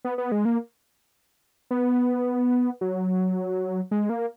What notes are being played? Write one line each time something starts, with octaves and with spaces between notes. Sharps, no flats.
B3
B3
G#3
A#3
B3
F#3
G#3
A#3